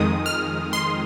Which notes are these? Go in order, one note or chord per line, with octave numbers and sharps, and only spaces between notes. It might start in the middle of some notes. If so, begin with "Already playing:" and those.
Already playing: F2 D#3 G#3 D#6
F6
C6